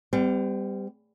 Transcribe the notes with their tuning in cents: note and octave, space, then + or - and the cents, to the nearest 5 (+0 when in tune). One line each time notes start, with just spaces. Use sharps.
G3 +15 C4 -45